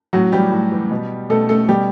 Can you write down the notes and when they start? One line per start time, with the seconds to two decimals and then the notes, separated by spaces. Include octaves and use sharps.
0.13 A2 F#3 F#4
0.32 E3 G3 G4
0.51 A2
0.71 E3
0.91 B2
1.30 B2 A3 A4
1.49 A3 A4
1.68 B2 G3 G4